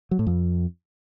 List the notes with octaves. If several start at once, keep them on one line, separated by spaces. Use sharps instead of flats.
F#3
A2
F2